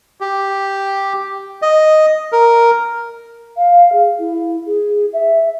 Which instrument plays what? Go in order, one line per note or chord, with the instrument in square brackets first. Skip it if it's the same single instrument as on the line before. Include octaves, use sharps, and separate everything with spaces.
[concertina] G4
D#5
A#4
[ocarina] F5
G#4
E4
G#4
E5